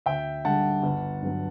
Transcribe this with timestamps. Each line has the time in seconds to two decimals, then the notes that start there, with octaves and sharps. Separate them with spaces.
0.06 D2 E5 G5
0.45 D3 G3 F#5 A5
0.83 G1
1.22 G2 F#3